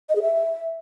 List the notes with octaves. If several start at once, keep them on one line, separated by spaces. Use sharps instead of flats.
D#5
G#4
E5